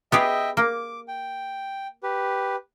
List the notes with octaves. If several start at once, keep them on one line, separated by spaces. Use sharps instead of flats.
B3 G4 G#4 D#5 E5 G5
A#3 D6
G5
G4 B4